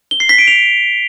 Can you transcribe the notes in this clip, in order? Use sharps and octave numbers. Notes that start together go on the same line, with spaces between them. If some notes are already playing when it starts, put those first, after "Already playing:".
G7
C7
B6
D7
F7